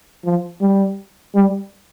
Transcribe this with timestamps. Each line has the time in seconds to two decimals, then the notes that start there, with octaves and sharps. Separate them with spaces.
0.25 F3
0.61 G3
1.35 G3